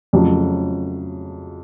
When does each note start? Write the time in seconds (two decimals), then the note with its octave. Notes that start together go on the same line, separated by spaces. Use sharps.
0.13 F2 C#3 F#3 A3